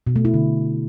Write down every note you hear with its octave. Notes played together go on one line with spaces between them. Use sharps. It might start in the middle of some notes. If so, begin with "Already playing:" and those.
B2
A3
E4
D3